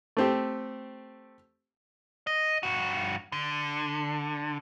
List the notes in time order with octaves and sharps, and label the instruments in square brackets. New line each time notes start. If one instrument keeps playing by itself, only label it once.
[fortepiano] A3 C4 G4
[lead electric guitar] D#5
G2 F#4
D3